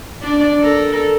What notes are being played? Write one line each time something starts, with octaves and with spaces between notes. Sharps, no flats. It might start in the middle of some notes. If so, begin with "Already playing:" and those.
D4 D5
A4 A#4